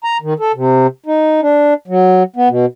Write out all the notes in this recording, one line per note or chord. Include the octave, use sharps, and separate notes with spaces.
A#5
D#3
A4
C3
D#4
D4
F#3
B3
B2